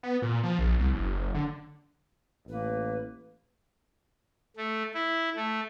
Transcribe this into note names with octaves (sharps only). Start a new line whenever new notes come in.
B3
A#2
F3
A#1
C2
F#1
D3
A1 A#3 B4
A3
E4
A3